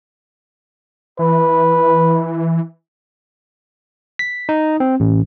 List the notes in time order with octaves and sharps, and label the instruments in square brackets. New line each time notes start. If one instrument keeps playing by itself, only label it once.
[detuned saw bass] E3 [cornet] B4
[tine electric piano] B6
D#4
C4
A1